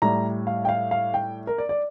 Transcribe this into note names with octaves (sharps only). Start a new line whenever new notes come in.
A2 G3 A#5
F5
G5
F5
F5
G5
A#4
D5
D5